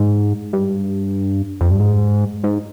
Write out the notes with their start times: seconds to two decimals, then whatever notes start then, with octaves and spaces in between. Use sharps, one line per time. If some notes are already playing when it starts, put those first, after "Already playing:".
Already playing: G#2
0.53 G2
1.61 F2
1.71 G2
1.80 G#2
2.44 G#2